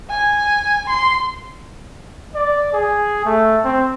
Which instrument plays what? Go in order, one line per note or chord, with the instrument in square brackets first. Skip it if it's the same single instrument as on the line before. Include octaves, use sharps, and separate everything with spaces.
[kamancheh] G#5
C6
[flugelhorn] D5
G#4
A3
C4